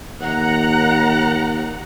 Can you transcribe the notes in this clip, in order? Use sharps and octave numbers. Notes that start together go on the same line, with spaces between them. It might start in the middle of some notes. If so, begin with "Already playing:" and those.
D#2 F#5 A#5